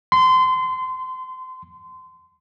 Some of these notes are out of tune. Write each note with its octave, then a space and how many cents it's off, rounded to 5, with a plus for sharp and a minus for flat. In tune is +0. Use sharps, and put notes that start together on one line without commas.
C6 -25